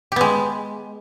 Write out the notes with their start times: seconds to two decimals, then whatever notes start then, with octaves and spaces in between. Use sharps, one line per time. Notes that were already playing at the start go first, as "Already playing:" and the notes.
0.12 G4
0.16 B3
0.21 G#3